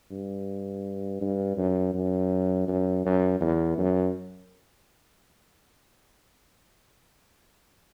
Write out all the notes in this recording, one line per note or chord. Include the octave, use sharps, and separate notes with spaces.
G2
G2
F#2
F#2
F#2
F#2
E2
F#2